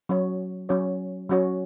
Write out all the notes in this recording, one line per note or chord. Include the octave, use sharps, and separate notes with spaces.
F#3 C#4 F#4 C#5
F#3 C#4 F#4 C#5
F#3 C#4 F#4 C#5